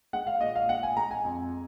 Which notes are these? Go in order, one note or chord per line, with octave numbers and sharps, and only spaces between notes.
G#3 F#5
F5
A#2 D#5
F5
G#3 F#5
G#5
G#3 A#5
G#5
F2